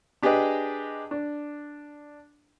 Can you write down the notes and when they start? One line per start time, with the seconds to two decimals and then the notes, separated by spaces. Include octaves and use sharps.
0.23 D4 G4 G#4 B4 D#5 G5
1.11 D4